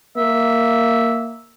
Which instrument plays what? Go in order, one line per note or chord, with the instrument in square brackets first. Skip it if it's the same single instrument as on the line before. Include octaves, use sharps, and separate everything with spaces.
[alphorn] A#3 [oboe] E5